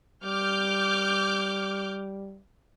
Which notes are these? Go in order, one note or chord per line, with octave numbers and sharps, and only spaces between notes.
G3 D6 F6 G6